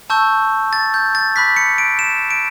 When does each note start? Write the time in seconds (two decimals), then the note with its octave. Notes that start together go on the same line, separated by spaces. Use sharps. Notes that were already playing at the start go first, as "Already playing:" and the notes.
0.10 A5 C#6 E6 G6
0.73 A6
0.94 G6
1.15 A6
1.36 B5 D6 F#6 B6
1.57 C#7
1.78 D7
1.99 E7
2.31 D7